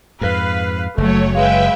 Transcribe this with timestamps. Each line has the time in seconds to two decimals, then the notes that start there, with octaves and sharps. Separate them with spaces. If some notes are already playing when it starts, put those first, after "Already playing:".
0.21 F2 G#2 B4 F5
0.98 F#1 F#3 A3 C#5
1.35 G#3 B4 E5 F5 G5